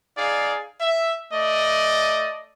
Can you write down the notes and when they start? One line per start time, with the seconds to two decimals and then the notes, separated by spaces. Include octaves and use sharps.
0.18 D#4 G#4 D5 F5
0.81 E5
1.33 A3 D5 D#5